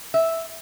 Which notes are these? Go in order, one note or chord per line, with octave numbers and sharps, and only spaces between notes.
E5